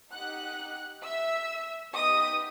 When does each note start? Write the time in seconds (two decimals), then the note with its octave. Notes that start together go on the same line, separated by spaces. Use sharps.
0.12 D#4 G4 F#5 F#6
1.04 E5 E6
1.95 B3 D#4 G4 D#5 D#6